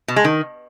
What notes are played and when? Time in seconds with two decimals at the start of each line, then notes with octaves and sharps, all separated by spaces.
0.08 B2
0.16 G#3
0.25 D#3